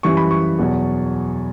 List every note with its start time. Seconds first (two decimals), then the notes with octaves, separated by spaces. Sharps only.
0.03 F#2 E3 G3 C#6
0.17 B5
0.31 C#6
0.59 E2 B2 F#3